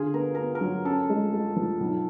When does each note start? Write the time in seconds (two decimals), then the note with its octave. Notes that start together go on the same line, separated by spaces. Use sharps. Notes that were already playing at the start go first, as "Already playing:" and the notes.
Already playing: D3 D4 F4 G#4
0.14 B3 A#4
0.35 B3 A#4
0.55 A#4
0.61 F#3
0.85 C#4 A4
1.09 G#3
1.33 G#3
1.56 F3
1.80 B1